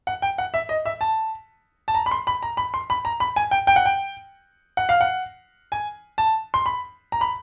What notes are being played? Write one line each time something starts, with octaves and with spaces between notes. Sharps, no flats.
F#5
G5
F#5
E5
D#5
E5
A5
A5
A#5
B5
C6
B5
A#5
B5
C6
B5
A#5
B5
G#5
G5
G5
F#5
G5
F#5
F5
F#5
G#5
A5
C6
B5
A#5
B5